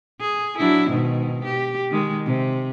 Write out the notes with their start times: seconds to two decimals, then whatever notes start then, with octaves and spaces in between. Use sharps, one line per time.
0.21 G#4
0.59 F#3 D4 E4
0.90 G#2 B2 D#3
1.45 G4
1.90 D#3 G#3
2.25 C3